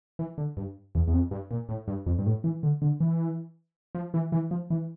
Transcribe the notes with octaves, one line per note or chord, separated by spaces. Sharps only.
E3
D3
G2
E2
E2
F2
G2
A#2
A2
G2
F2
G2
A2
E3
D3
D3
E3
F3
E3
E3
F3
E3